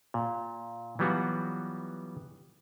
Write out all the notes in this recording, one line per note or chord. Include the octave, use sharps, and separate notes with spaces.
A#2
E3 F#3 G3 B3 F4 F#4